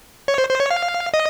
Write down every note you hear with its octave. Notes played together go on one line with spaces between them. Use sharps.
C#5
C5
C5
C#5
F5
D#5